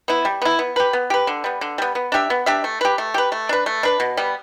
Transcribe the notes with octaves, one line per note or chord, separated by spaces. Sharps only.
B3 E4
G3
B3 E4
B3
G4 B4
B3
G4 B4
D3
G3 B3
D3
G3 B3
B3
D4 G4 E5
B3
D4 G4 E5
A3
G4 B4
A3
G4 B4
A3
D4 B4
A3
D4 B4
B2
G3 B3